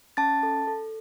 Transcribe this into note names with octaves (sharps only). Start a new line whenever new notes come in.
C#4 A5 A6
A4
A4